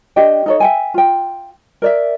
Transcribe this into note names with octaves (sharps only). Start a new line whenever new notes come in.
D4 G4 D#5 G5
D#4 A4 C#5
E5 G5 G#5
F4 G5
A#4 D5 E5